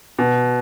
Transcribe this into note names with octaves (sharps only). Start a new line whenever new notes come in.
B2